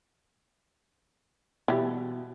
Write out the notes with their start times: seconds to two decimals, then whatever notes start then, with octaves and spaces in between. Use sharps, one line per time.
1.68 B2 E3 G3